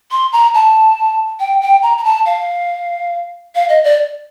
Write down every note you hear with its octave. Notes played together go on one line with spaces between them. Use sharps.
C6
A#5
A5
G5
G5
A#5
A#5
A5
F5
F5
D#5
D5